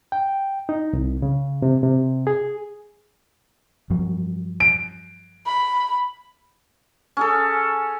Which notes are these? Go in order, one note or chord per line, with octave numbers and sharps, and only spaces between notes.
G5
D#4
C2
C#3
C3
C3
G#4
G2 F3 F#3
D7
B5
C#4 G#4 A4